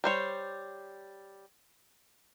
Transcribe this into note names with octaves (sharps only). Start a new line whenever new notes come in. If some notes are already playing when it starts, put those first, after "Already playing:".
G3 C5 C#5